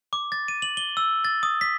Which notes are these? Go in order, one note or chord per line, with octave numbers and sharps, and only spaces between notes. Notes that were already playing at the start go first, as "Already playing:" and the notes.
D6
A6
D#7
F#7
G7
E6
A6
D#6
B6